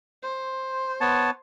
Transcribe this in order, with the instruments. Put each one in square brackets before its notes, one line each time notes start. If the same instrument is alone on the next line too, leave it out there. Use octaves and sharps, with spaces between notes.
[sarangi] C5
[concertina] B3 C#5 A5